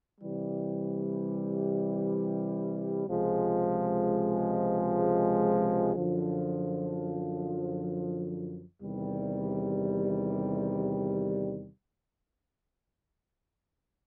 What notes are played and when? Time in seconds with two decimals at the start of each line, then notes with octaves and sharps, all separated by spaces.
0.21 C3 E3 G3
3.08 C#2 C3 F3 G#3
5.95 F#2 D3 F3
8.82 E2 C3 D#3 G3